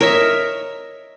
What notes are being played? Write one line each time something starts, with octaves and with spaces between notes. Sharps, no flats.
A#4 C#5 D#5 E5